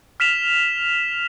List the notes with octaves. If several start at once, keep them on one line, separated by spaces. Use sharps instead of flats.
F6 B6 E7 F7